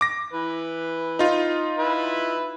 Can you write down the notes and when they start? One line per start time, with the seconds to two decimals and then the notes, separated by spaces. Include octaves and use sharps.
0.01 D6 A#6
0.33 E3 B4
1.19 D#4 F4
1.79 E4 B4